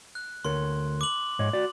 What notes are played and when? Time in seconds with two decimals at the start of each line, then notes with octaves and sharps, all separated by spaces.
0.15 F#6
0.45 D2 A#4 C#5 C6
1.01 D6 F#7
1.39 G#2 C#5 D#5
1.53 F#4 D5